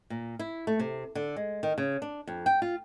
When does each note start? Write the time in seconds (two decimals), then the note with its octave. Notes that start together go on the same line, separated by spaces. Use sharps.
0.10 A#2
0.39 E4
0.67 A3
0.79 C3
1.15 D3
1.36 G#3
1.63 D#3
1.78 C#3
2.02 D4
2.27 F2
2.46 G5
2.62 F4